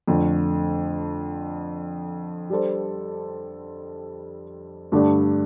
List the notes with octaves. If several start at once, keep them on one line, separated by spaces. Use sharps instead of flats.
F2 D3 A3
G3 D4 A4 C5
G2 D3 A3 D4 G4